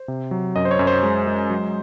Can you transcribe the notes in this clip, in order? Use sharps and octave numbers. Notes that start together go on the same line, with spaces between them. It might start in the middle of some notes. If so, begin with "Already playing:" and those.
Already playing: C5
C3
F#3
F#2 D#5
C5
C#5
F#2
C5
G#3
G#3
F#3